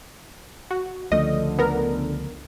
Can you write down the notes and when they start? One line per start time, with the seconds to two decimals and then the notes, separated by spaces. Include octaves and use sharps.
0.71 F#4
1.12 C#2 D3 F3 A3 D#5
1.59 B3 A#4